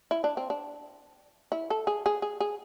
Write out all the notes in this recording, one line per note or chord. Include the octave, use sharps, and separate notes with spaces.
E4
D4
C4
D4
E4
A4
G#4
G#4
G#4
G#4